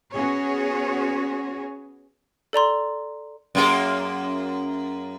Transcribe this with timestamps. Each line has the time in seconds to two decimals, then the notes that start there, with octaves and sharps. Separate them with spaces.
0.13 B3 C#4 F#4 G#4 C#5
2.53 A4 D5 A#5 C6
3.55 F#2 A#3 G#4